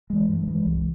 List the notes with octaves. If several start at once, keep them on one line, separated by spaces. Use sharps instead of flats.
E3 G#3
G2
E3 G#3
C2